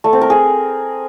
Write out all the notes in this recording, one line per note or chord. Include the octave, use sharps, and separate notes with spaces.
A3
C4
A#4
G#4